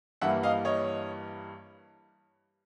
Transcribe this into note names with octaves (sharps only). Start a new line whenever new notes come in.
G2 E3 G3 A#3 E5 F#5
D#5 F5
C#5 D#5